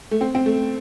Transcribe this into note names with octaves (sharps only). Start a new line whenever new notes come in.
A3
C4
C4
A3